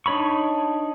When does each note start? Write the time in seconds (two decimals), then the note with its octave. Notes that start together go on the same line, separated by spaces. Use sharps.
0.06 D4 D#4 C#5 B5 C#6